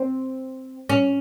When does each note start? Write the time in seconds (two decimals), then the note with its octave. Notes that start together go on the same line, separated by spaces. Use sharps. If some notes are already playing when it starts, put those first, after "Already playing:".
Already playing: C4
0.89 C#4